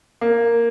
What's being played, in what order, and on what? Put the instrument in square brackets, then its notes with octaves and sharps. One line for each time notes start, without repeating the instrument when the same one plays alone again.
[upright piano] A#3